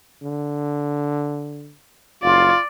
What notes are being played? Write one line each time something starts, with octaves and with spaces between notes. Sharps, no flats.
D3
F#1 F4 D5